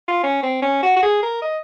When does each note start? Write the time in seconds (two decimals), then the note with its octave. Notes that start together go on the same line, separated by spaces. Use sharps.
0.08 F4
0.23 C#4
0.43 C4
0.62 C#4
0.83 F#4
0.96 F#4
1.03 G#4
1.23 A#4
1.42 D#5